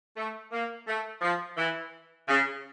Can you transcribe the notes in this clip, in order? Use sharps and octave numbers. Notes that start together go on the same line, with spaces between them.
A3
A#3
A3
F3
E3
C#3